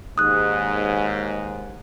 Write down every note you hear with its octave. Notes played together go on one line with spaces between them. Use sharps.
D#2 G#2 D#6 F#6